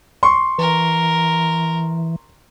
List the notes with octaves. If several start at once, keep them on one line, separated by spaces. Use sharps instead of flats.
C6 C#6
E3 A#4